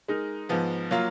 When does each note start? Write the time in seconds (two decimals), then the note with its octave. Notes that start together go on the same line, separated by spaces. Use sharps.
0.08 G#3 D#4 A#4
0.49 G#2 F3 B3
0.91 F#3 A#3 F4